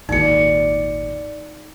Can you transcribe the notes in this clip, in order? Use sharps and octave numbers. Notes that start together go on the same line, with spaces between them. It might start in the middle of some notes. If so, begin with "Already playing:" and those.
G#1 D#2 A#2 D#4 D5 C#7